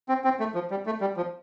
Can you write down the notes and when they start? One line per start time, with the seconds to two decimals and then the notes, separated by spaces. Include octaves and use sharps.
0.09 C4
0.24 C4
0.40 A3
0.55 F3
0.71 G3
0.86 A3
1.01 G3
1.17 F3